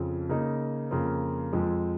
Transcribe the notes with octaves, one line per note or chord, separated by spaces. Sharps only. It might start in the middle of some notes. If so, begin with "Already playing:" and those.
Already playing: F2 C#3 F3
C#3 A#3 D#4
F2 C#3 A#3 F4
F2 F3 G#3